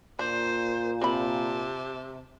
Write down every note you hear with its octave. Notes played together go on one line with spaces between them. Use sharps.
A#2 D4 C5
C3 C4 A5 B5